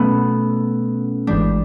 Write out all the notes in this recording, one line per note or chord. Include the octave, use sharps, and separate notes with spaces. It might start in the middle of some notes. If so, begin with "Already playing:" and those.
Already playing: B2 F#3 A3 B3 C#4
G#1 G#2 E3 G#3 D4